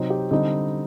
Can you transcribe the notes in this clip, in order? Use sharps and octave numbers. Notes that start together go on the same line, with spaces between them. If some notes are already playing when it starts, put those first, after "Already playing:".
Already playing: C3 F#3 C4 D#4
G4
D3 G3 C4 D#4 D#5